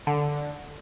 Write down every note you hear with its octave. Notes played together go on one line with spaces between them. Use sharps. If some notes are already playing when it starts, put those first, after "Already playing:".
D3